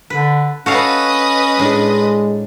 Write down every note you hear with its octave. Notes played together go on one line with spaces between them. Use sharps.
D3 B4
C#4 F#4 A4 B4 D#5 F5
A2 G#3 D4